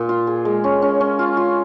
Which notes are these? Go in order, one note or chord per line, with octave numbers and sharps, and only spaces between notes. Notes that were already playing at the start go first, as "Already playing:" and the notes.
Already playing: A#2
F4
G#4
G#3
C#4
C#4
C#4
F4
F4